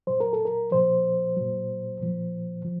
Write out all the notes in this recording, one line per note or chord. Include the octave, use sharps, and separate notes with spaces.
A#2 F#3 C5
A#4
A4
A#4
A#2 F3 C5
A#2 F#3
A#2 F3
F3